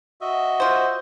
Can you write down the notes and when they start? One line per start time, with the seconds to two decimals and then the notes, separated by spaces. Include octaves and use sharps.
0.21 F#4 D#5 E5
0.60 F4 C5